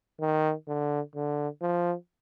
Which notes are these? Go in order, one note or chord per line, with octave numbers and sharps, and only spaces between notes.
D#3
D3
D3
F3